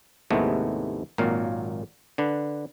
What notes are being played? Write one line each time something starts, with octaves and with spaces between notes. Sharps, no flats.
D#2 A2 C3 G#3 A3 B3
G#1 A#2 F#3 A#3 F5
D3 D4 B4